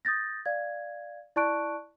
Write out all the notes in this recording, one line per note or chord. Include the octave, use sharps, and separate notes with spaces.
D#6 G6 A6 A#6
D5 F5 G#6
E4 D5 A5 C#6 F#6 D7